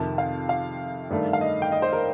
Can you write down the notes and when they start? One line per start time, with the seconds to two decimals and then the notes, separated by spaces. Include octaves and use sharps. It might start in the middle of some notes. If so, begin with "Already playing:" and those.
Already playing: F2 C3 D#3 A5
0.18 F5
0.49 F5
1.10 G2 D#3 A3
1.33 F5
1.41 D#5
1.62 G5
1.72 D#5
1.82 C5
1.93 A#4